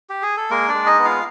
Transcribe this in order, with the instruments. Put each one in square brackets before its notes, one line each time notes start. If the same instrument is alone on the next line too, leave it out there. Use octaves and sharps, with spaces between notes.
[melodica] G4
G#4
A4
G#3 A#3 A#4
D4 D5
G#3
D#4 D#5
B3
F4 F5